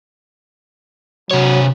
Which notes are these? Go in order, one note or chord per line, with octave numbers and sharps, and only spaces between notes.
C3 F#3 C#5